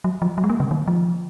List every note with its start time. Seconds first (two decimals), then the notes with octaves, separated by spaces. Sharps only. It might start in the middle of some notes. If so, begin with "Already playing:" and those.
0.04 F#3
0.22 F3
0.38 F#3
0.44 G#3
0.50 A#3
0.60 C#3
0.71 D#3
0.88 F3